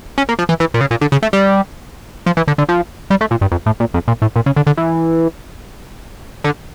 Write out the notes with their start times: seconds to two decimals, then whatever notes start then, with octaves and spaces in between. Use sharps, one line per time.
0.18 C#4
0.29 A#3
0.39 F3
0.49 E3
0.60 E3
0.74 A#2
0.81 C#3
0.91 A#2
1.01 D3
1.12 C#3
1.23 A3
1.33 G3
2.26 F3
2.37 E3
2.48 D3
2.58 D3
2.69 F3
3.10 G3
3.21 A3
3.31 A#2
3.41 G2
3.52 F2
3.66 A2
3.80 A#2
3.94 F2
4.08 A#2
4.22 A2
4.36 A#2
4.46 C#3
4.56 D3
4.67 D3
4.77 E3
6.44 D3